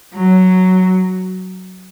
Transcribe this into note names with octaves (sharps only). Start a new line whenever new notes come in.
F#3